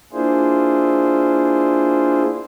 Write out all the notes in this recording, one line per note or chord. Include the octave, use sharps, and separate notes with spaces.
A#3 D4 E4 F4 G#4 C5